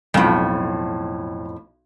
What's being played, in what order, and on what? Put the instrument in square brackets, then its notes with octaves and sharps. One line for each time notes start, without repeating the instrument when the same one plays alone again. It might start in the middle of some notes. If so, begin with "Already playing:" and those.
[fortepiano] B1 F4 [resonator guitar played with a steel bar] F2 A2